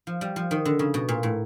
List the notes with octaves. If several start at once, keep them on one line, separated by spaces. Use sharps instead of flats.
F3
G3
F3
D#3
D3
C#3
B2
A#2
A2